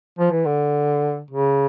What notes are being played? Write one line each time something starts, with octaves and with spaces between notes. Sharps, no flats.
F3
E3
D3
C#3